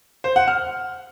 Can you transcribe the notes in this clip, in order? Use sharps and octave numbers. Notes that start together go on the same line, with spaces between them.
C5
F#5
F6